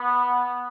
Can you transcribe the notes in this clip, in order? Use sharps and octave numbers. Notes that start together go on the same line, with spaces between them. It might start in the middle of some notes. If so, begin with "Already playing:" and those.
Already playing: B3